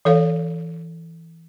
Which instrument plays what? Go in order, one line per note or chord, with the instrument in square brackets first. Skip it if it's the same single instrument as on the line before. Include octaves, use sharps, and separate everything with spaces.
[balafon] E3 A4 C#5 F5